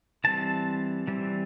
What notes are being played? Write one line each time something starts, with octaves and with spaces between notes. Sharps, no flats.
E3 G3 C4 A5
E3 G3 C4